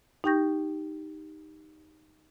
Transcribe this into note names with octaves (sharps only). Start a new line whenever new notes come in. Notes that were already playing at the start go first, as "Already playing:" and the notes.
D#4 G4 G5 C#6 G6 A#6